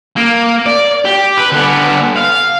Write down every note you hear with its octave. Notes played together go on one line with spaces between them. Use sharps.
A#3
D5
G4
B4
D3 B3
F5